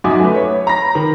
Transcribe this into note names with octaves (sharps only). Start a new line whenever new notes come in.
F#2 D#4 F#4 E5 G#5 D6
A3 B4
C#5
A#5 B5 A#6
D#3